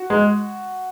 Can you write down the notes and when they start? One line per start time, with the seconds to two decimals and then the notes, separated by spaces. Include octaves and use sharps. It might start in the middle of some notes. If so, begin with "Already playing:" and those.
Already playing: F#4
0.10 G#3